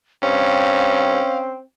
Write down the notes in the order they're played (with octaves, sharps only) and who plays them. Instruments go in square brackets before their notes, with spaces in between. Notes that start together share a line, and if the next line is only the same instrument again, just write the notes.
[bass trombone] G2 [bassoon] C4 [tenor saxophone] C#4 [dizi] F5